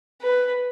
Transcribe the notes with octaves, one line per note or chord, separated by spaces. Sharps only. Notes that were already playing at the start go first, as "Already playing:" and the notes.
B4